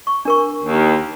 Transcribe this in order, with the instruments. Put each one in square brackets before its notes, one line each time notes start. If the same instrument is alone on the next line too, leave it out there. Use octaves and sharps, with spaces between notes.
[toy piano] C#6
D4 A#4 C#6
[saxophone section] D#2